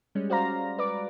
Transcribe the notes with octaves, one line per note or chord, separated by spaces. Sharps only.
G3 G#3 C#4
F#4 C5 D5 F5 A#5 A#6
B4 D5 D6